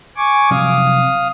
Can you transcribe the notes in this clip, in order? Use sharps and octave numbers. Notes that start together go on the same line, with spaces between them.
G#5 C#6 D6
C3 F3 F#3 F5 D#6